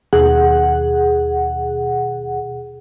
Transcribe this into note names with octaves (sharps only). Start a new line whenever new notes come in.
D#2 B2 G#4 F#5